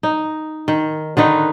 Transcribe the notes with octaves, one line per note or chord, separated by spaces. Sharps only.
D#4
D#3
D3 D#3 D#4 B4